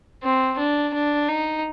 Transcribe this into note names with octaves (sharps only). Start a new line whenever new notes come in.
C4
D4
D4
D#4